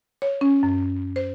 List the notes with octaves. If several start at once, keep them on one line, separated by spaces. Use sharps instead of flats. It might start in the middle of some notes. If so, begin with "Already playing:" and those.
C#5
C#4
F#2
C5